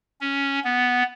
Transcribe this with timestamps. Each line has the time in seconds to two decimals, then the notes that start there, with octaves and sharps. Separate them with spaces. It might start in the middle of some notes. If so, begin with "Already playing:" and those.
0.21 C#4
0.64 B3